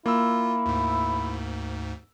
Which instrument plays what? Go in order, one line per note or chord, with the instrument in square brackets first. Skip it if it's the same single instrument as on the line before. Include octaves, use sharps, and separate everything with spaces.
[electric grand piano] A#3 E6 [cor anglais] E4 [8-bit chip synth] F4
[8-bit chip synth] D2 G#2